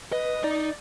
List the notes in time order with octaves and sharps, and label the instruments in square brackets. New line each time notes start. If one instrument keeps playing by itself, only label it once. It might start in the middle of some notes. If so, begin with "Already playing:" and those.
[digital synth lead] B4 [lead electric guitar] D#5
[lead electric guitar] D#4 [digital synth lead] D5